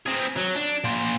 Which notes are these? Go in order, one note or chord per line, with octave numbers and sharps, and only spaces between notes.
C4 G#4
F#3
D4
A#2 C5